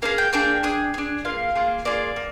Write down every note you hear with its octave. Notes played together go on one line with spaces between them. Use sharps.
A#3 D4 G#4 F5
G5
A#3 D4 G#4 G5
D4 G#4
D4 G#4
A#3 F4 G#4 F5
A#3 F4 G#4
A#3 F4 G#4 D5
A#3